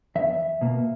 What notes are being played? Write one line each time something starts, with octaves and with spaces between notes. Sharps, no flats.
E2 E5
B2 A#3